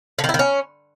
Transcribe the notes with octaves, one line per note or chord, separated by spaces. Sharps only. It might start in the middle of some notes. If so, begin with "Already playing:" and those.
D3
D#3
E4
D#3
C#4